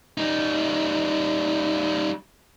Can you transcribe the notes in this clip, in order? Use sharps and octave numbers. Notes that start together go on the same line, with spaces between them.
G3 D#4